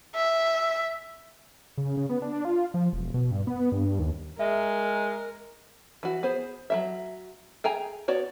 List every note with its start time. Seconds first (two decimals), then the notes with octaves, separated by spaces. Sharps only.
0.15 E5
1.77 C#3
1.97 C#3
2.09 B3
2.22 D4
2.45 F4
2.74 F3
2.93 E1
3.14 B2
3.31 G2
3.47 B3
3.72 G2
3.99 D#2
4.39 G#3 A#4 E5
6.03 E3 F#4
6.23 B3 G#4 C5
6.70 F#3 C4 E5
7.64 G#4 G5 G#5 A#5
8.08 B3 F#4 C#5 D5